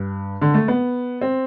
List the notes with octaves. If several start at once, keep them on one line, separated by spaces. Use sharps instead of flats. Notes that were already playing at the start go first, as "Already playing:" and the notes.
Already playing: G2
D3
A3
B3
C4